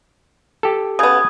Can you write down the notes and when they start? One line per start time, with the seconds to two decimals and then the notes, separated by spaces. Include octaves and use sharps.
0.63 G4 A4
0.99 C#3 B3 D#6 G#6